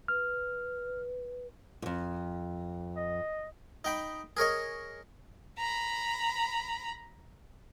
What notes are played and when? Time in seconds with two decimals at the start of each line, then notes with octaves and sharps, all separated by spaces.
0.08 B4 F6
1.82 F2 G#2
2.96 D#5
3.84 D#4 G5 B5
4.37 G#4 A#4 C#5 D#5
5.58 A#5 B5